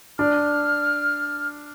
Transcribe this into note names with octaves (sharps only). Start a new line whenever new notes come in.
D4 F6